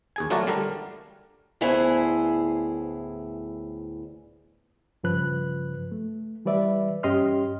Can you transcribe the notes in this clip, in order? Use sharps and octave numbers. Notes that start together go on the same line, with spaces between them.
D#2 G#4 G#5
F#3 A3 F4 F#4 A#4 D5
D3 G3 D4 A#4
D2 A2 B3 E4 G#4 C5
G2 C#3 F3 B4 F#6
A3
E3 G3 B4 D5 E5
G2 C#4 G4 D#5 C6 F6